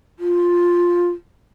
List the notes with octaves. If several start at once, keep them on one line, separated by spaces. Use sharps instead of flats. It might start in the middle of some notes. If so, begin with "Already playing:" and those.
F4